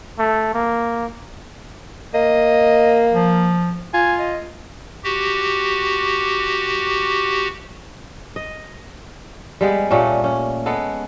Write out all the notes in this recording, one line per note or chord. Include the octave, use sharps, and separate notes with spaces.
A3
A#3
A#3 D#5
F3
F4 G#5
D#5
F#4 G4
D#5
G3 G#3 B3
A#2 G3 A3 C#4
C#4
G#3 B3 A4